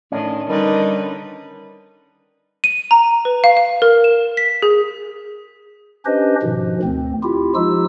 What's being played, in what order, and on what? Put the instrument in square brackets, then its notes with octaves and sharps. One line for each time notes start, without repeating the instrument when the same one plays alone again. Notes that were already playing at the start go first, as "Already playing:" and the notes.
[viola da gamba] A2 D#3 [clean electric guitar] C#4 D4
[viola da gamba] D3 D#4 B4 [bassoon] D#3 [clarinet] G3
[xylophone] D#7
A#5
B4
F5
F5
A#4
E7
B6
G#4
[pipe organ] C#4 D4 G4 B4 C5 D#5
G#2 B2 D#3 F3
D2 C4
E4 F4 G4
F3 G#3 D#4 F4 G4 E6